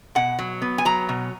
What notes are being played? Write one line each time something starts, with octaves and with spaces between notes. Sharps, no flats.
B2 F#5
F#3
B3
G#5
F#3 A#5
B2